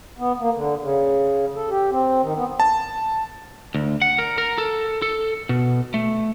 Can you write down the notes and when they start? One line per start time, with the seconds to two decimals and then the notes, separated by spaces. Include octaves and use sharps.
0.18 B3
0.39 A#3
0.54 D3
0.82 C#3
1.56 A4
1.70 G4
1.91 C4
2.22 D#3
2.37 B3
2.60 A5
3.75 D2
4.02 F#5
4.18 A#4
4.38 A#4
4.58 A4
5.02 A4
5.49 B2
5.94 A3